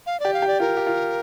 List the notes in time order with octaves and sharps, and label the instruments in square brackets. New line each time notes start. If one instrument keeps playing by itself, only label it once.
[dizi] F5
[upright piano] G4 [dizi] D5
[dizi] F5
[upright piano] G4
[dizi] D5
[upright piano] F4 [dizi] A#4
[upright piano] G4
F4